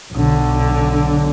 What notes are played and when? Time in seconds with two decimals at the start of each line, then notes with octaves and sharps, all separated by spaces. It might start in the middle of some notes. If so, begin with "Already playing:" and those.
0.12 B1 D3